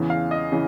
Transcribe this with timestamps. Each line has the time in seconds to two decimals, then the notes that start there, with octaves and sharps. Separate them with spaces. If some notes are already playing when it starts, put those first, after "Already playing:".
Already playing: E2 C#3 E3
0.10 F5
0.31 D#5
0.52 C#3 E3